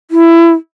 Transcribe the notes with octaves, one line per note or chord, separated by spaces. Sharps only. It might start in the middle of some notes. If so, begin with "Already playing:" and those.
E4